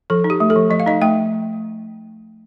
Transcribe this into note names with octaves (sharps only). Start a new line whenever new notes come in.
F3 A4
D#4
G4
A3
A4
F3
F3 D#5
F5
D#4 D#5
A3 G5